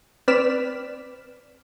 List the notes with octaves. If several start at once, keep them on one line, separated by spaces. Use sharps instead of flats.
C4 B4 D5 F6 B6 E7